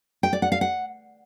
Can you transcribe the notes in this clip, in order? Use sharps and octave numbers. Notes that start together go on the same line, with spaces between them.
G5
D5
F#5
F5
F#5